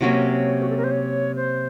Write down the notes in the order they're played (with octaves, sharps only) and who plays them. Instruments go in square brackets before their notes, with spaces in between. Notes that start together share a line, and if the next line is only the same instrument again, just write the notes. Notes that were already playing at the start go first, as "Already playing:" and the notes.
[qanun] C3 F#3 A#3 C#4 [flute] C#5
[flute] F#4
A4
A#4
C5
C#5
C5